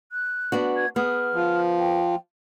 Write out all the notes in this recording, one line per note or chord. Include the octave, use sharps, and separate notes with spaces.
F#6
B3 D4 F#4
G#6
B3 G#4 F6
F3
G5